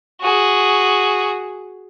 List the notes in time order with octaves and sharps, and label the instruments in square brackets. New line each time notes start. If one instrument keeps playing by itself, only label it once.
[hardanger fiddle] F#4 G#4